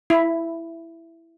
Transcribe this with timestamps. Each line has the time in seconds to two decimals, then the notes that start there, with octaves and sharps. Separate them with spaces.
0.10 E4